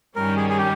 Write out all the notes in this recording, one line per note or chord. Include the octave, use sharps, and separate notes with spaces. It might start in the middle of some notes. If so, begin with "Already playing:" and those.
G2 D#3 G3 C#4 A#4
G#4
G#4
G4